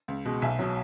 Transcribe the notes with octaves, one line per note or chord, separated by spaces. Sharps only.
C#2
B2 G#3
B1 E5 G#5
B2 F#3